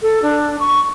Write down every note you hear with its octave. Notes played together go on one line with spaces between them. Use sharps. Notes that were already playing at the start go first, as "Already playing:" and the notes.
A4
D4
C#6